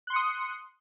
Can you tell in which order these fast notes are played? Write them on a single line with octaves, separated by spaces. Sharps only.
F#6 C6 C#7 D#6